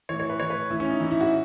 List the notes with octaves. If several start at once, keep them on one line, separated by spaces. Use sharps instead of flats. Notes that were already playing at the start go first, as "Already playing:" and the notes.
A2 E3 C#5
C#5
B4
A2 E3 C#5
B4
A2 E3 E4
C#4
D#4
A2 E3 E4
E4
F#4